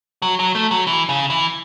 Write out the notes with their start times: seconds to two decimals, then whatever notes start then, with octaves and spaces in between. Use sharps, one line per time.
0.22 F#3
0.40 F#3
0.55 A3
0.71 F#3
0.87 E3
1.09 C#3
1.30 E3